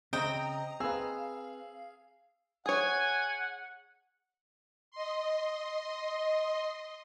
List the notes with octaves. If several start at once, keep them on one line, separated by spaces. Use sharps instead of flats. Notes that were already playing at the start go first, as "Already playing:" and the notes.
C#3 C4 D#5 G5 A#5 D#6
C4 G#4 B4 F5 E6
G#4 C#5 F#5 G#5
D#5 C6